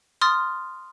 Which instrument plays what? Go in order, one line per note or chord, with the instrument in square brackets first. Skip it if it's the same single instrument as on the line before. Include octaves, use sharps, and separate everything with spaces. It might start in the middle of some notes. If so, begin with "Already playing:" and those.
[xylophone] C6 D#6 F6 A6